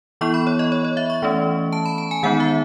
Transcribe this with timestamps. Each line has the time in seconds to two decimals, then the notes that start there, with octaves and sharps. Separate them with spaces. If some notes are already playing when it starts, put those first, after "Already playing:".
0.21 E3 B3 E4 C#6
0.34 B5
0.47 C#5
0.59 D#5
0.72 C#5
0.85 C#5
0.97 E5
1.10 C#6
1.22 E3 A3 C#4
1.73 A5
1.86 B5
1.98 A5
2.11 G#5
2.23 D#3 G#3 B3 D#4 F#5
2.40 E5